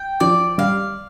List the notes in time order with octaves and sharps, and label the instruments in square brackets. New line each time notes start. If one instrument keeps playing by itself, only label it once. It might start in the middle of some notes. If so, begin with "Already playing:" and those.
Already playing: [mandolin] G5
[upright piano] F3 [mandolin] D5
[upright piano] G3 [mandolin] F5